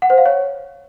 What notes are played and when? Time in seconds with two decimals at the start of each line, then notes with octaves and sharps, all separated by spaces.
0.02 F#5
0.10 C5
0.18 F5
0.26 C#5